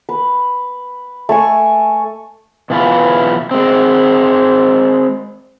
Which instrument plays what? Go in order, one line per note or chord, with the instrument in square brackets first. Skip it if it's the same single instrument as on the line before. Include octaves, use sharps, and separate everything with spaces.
[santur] B4
A3 G#5 C#6
[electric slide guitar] B2 E3 F4 B4
G#3 C4